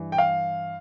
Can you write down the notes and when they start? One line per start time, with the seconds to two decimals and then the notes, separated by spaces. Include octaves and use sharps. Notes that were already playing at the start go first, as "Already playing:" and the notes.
Already playing: G2 E3
0.12 G5
0.18 F5